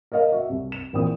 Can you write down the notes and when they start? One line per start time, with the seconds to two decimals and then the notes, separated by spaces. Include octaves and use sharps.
0.12 A#4 C#5 D#5 F5
0.32 F#4 E5
0.49 C2
0.72 E7
0.93 A#1 A#2 E3 C4 D#6